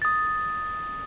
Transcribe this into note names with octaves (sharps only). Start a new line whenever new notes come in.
D#6 A6